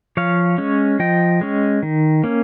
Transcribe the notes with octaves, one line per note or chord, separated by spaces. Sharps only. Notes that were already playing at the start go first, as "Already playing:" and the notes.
F3 C#5 F5
G#3 C#4
F3 D#5 G5
G#3 C#4
D#3
A#3 C#4